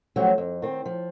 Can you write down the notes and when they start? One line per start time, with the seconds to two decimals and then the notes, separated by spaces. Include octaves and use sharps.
0.16 F3 F#3 A3 C#4 F#4 G4
0.38 F2
0.62 D#3 C4
0.86 F3